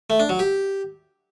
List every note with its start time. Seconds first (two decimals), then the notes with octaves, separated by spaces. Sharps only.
0.10 A3
0.20 D4
0.29 F#3
0.39 G4